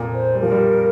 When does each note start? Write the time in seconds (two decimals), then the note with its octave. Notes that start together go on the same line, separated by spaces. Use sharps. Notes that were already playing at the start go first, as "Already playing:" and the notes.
Already playing: F2 A#2
0.14 C5
0.35 G3
0.40 F3 A#4
0.51 G3